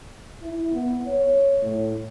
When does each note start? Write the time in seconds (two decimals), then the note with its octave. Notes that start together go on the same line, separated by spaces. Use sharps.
0.41 E4
0.72 B3
1.07 C#5
1.62 A2